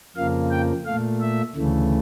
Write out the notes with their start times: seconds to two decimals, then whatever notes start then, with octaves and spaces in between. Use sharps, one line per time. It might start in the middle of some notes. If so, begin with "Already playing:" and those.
0.16 F2 C#3 F3 A#3 F5
0.51 G5
0.86 A#2 A3 F5
1.21 E5
1.56 D2 C#3 E3 A3